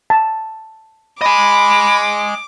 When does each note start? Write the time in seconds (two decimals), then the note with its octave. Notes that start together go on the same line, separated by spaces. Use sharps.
0.10 A5
1.21 D#5 G#5 B5 D6